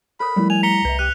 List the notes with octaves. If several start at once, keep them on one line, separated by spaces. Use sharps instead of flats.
A4 A#4 B5 D#6
F3 G3 A3 E4 A#4
G#5 F7
A#5 B6 C#7 G7
C2 B4 E5
G4 F#6 D#7 F7